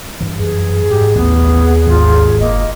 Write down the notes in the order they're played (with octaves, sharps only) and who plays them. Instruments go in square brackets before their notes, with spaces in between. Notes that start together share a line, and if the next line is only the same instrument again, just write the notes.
[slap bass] G2 E3
[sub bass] F#2 [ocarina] G#4
[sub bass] G#2 [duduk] G4
[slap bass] A1 [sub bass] D#2 [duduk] B3
[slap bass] G#1 [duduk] F4
[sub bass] F#1 [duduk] A#3 [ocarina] D#5